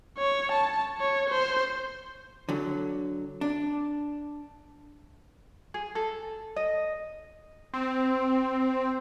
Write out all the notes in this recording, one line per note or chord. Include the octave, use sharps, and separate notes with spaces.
C#5
A5
C#5
C5
D3 F#3
D4
G#4
A4
D#5
C4